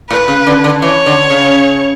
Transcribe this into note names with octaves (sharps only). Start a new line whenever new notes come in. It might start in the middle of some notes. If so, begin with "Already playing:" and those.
A2 B4
C#3
D3
D3
E3 C#5
D3
C#3